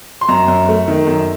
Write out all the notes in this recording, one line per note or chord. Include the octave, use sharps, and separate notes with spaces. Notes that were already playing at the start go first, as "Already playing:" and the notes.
C6
F#2 A#5
F#2
A3
D#3
F#2